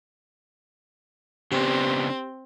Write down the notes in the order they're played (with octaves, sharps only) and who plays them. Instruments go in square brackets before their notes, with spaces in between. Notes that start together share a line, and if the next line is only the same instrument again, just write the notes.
[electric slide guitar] C#3 B3 D4 [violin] C4 [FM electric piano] G4